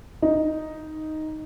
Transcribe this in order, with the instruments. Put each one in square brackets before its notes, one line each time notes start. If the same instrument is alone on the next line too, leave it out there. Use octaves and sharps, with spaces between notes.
[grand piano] D#4